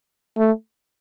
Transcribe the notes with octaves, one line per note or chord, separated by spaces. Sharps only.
A3